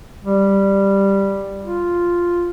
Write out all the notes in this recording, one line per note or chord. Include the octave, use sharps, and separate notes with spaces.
G3
F4